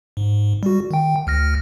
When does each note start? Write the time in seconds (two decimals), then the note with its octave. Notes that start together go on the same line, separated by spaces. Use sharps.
0.17 G#2
0.63 G3 F#4
0.91 D#3 G5
1.27 D2 F6 A#6